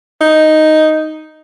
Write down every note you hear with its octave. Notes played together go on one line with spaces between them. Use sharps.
D#4